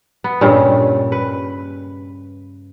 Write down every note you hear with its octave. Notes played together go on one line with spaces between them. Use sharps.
B3
G2 A#2 C#3
B4